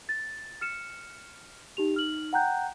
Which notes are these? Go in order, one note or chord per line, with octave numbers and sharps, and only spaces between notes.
A6
F6 C#7 E7
D#4 G4 F7
D#4 F6 F#7
F#5 G5 A#5 F#6 G6